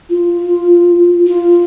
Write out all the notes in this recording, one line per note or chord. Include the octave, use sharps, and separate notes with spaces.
F4
F4